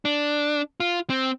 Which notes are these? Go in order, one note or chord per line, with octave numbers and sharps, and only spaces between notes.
D4
F4
C4